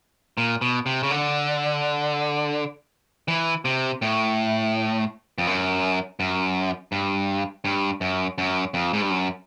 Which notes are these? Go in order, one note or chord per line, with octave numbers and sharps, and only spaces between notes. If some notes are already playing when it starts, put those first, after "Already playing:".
A#2
B2
C3
C#3
D3
E3
C3
A2
F2
F#2
F#2
G2
G2
F#2
F#2
F2
G#2
G2
F#2